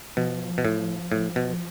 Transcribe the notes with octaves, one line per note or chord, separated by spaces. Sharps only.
B2 F3
B2
A2
A2
B2